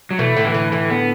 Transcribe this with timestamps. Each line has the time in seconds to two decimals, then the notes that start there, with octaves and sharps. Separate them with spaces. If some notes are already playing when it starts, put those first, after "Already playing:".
0.11 F#3
0.18 B2 E3 A3
0.36 A2 D3
0.45 E3
0.54 A2 D3
0.72 A2 D3 E3
0.90 B3